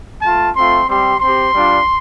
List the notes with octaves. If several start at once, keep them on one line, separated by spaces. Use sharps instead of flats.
A3 F4 A5
A3 C4 F4 C6
G3 C4 G4 C6
C4 G4 C6
G3 D4 F4